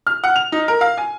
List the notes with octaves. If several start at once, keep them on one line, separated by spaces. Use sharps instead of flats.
F6
F#5
F7
D#4
A#4
F5
G#5